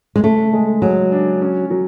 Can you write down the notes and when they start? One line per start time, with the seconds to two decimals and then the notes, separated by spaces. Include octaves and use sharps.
0.15 G#3
0.24 C#3 A3
0.53 G#3
0.82 F#3 G#4
1.12 D4
1.41 C#4
1.70 F#3